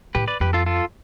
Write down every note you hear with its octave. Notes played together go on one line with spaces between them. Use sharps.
A2 G4 B4
B4 D5
F2 G4 B4
F4 A4
F4 A4